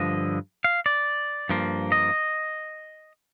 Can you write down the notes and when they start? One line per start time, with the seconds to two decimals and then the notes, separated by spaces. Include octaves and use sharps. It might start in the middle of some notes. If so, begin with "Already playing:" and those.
Already playing: G2 D3 F3 D#5
0.64 F5
0.86 D5
1.49 G2 F3 A#3
1.92 D#5